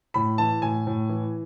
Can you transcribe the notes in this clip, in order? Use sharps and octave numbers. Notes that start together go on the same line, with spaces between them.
A2 B5
E3 A5
A2 G#5
A2
E3